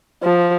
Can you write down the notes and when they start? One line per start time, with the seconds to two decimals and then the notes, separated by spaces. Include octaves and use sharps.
0.23 F3